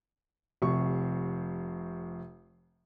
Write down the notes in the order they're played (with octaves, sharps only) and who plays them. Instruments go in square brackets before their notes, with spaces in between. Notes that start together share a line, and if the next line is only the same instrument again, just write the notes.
[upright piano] F1 C3 C#6